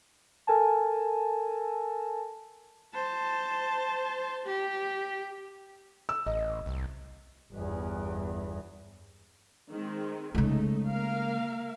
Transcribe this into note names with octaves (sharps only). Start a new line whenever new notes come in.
A4 A#4 G#5 A5
C5 A5
G4
E6
A1 D#5
C2
G1 E2
D#3 G#3 C4
C#3 G#3 A3 D#4
A#3 A#4 F5